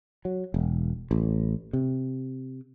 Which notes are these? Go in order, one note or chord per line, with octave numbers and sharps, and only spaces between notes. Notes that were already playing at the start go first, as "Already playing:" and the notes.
F#3
E1
A1
C3